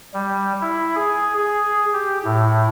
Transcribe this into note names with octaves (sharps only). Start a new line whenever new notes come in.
G3
E4
G#4
G#4
G4
A2